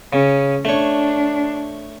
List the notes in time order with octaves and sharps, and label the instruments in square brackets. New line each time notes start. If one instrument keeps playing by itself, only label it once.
[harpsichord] C#3 [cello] C#4
[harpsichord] A3 C#5 [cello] D4